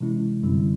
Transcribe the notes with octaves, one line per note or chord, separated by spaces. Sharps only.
C3 E3 G#3 C#4 E4
F#2 D3 G3 C4 E4